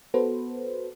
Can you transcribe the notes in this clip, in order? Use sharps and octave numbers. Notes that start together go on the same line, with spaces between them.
B3 F#4 A4 B4 C5